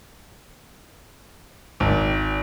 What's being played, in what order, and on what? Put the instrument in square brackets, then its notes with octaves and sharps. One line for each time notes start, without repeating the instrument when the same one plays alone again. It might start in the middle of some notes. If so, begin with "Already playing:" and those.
[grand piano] G#1